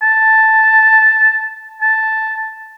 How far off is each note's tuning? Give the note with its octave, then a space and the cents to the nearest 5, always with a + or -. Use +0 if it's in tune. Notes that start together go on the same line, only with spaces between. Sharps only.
A5 +0
A5 +0